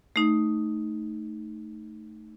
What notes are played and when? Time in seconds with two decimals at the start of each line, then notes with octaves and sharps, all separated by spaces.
0.16 A3 D#4